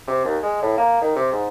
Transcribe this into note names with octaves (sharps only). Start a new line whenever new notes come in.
C3
D#2
G#3
A2
A#3
D#3
C3
G#2